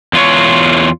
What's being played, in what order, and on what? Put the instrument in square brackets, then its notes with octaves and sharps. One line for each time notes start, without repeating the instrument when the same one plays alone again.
[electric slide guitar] E2 F4 C#5